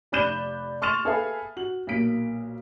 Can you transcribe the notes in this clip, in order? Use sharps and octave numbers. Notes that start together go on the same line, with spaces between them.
F1 D5 B5 F#6 G6 E7
C6 C#6 F6 A6 E7 F7
G#4 A4 B4 E5 F5 G#5
F#4 F#7
B1 A#2 A#3 B6 D7